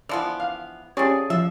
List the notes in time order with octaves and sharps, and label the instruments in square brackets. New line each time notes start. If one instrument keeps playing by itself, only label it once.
[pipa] E3 F3 B3 [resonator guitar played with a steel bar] D5
[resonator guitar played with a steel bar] F5
[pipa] C3 F3 [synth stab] C#4 G4 [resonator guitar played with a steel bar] G#4 D5 G#5
[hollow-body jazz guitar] F3 [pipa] E5